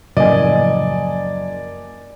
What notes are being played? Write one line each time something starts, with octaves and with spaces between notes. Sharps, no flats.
F#1 A2 C#3 F3 D5 D#5 G#5